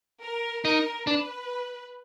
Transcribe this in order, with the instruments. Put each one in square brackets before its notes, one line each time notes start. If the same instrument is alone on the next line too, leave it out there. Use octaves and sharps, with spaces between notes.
[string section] A#4
[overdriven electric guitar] D#4 [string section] A#4
[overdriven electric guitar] D4 [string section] B4